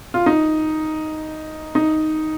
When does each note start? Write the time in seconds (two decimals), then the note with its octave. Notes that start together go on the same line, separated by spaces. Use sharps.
0.14 F4
0.26 D#4
1.75 D#4